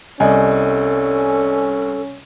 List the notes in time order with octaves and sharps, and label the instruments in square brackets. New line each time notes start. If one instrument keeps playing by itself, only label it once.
[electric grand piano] C2 [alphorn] C#4 [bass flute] A4 [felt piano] D5 D#5 G#5